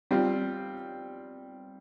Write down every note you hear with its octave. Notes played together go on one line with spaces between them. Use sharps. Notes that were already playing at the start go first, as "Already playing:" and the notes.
G3 C4 F4